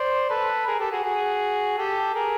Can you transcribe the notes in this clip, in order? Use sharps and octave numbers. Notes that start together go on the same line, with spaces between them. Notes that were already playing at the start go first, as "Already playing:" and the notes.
Already playing: C5 D5
A4 B4
G#4 A#4
G4 A4
F#4 G#4
F#4 G#4
G4 A4
G#4 A#4